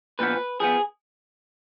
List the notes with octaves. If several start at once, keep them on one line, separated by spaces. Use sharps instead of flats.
A#2 F3 B3 B4
F3 B3 G#4